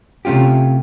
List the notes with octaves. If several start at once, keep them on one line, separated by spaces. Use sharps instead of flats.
C3 A3 C#4 F4 G4